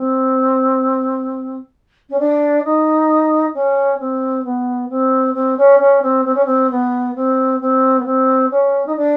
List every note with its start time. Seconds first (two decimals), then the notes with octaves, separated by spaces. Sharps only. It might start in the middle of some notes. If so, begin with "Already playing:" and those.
Already playing: C4
2.09 C#4
2.19 D4
2.64 D#4
3.54 C#4
3.99 C4
4.44 B3
4.89 C4
5.34 C4
5.57 C#4
5.79 C#4
6.02 C4
6.25 C4
6.34 C#4
6.45 C4
6.70 B3
7.15 C4
7.60 C4
7.99 B3
8.05 C4
8.50 C#4
8.86 D#4
8.96 D4